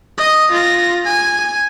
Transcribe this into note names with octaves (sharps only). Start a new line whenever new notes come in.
D#5 D#6
F4 A#6
G#5